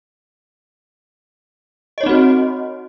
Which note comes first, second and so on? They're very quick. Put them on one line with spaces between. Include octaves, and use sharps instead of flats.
D#5 C#5 D#4 C4 F#4